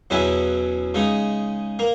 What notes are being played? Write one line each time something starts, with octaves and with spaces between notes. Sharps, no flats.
E2 B2 F#3 C#4 E4
C#3 G#3 D#4
A#3